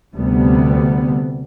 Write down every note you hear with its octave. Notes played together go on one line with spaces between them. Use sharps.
D2 C3 G3 B3